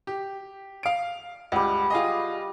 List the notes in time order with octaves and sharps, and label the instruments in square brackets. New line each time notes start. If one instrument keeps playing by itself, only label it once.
[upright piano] G4
F5 D7
[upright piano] C#2 [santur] G3 F#5
[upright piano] F4 G#4 D#5